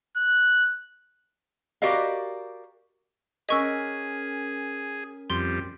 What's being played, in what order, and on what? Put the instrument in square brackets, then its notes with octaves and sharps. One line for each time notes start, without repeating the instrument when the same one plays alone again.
[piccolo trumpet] F#6
[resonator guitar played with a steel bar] F#4 G4 A#4 D5 D#5 F5
[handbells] C#4 A#4 B6 [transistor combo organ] G#4 [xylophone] D#5 C#6 E6
[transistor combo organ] F2 G3 [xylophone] C6